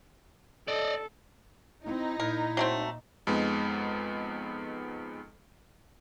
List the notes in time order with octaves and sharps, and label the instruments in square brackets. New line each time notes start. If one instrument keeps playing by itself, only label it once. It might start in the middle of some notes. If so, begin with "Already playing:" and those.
[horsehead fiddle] A4 [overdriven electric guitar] D5 D#5
[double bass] C4 [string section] D#4 [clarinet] E4
[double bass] A#2 [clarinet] E4 [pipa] A#4
[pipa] F#3 A3 C4
[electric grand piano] F2 G#3 B3 D#4